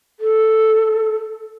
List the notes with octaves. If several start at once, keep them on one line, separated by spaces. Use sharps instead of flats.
A4